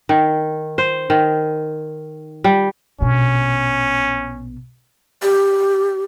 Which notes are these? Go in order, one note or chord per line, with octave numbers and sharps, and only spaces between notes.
D#3
C5
D#3
G3
A#1 B2 C#4
G4